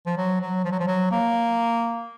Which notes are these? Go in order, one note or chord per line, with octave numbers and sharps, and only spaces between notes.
F3
F#3
F#3
F3
F#3
F3
F#3
A#3